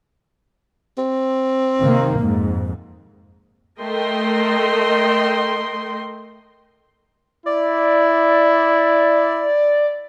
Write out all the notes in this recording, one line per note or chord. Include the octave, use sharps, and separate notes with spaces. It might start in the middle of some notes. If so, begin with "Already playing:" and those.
C4
C3 D#3 A#3
F2 G#2
A3 A#4 D#5 G5 C6
E4 D5